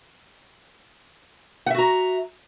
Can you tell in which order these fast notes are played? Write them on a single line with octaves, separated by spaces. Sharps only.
F#5 E5 F#4 A#5